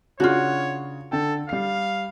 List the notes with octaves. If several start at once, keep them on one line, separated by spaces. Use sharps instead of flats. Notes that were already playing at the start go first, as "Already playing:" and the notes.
C#3 D4 F4 F#4 G#4 C#5
D3 A4 G5
G3 F5 C7